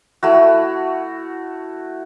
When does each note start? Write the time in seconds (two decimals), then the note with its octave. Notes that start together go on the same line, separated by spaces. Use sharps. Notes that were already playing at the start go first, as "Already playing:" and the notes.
0.23 A3 E4 F#4